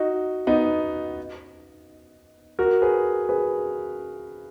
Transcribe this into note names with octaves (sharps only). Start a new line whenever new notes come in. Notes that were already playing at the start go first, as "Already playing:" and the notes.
Already playing: D#4 F#4
B3 D#4
F#4 A#4
G#4 B4
G#4 B4